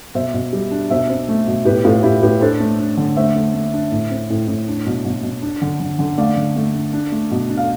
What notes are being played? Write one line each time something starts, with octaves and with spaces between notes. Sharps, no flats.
B2 C5 E5
B2
G3
D4
B2 C5 E5
C4
A3
B2
A2 G4 B4
A2 F4 A4
A2 E4 G4
A2 G4 B4
D4 A4 C5
A3
D4
D3
A3 C5 E5
A3
A3
D4
A2
C4
A2
A2
D4
B2
B2
B2
D4
D3
D3
D3
A3 D5 F5
D3
A3
D4
D4
A3
B2
D4
F5